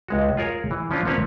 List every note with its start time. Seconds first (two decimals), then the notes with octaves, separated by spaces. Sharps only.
0.08 C#2 G#3 F#4
0.37 F4 G#4 A#4 C#5
0.71 E3
0.91 F3 C#4 D4 F4
1.05 F3 A#3 C4 C#4 B4 C#5